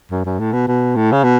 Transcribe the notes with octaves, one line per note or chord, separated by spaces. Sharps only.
F#2
F#2
A2
B2
B2
A2
C#3
B2